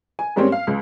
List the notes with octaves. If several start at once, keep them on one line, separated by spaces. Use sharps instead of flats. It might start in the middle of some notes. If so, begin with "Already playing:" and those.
G#5
G#2 G3 A#3 C4 C#4
F5
C#2